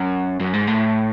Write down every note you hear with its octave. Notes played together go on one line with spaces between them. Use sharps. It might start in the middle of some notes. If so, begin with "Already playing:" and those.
Already playing: F#2
F#2
G#2
A2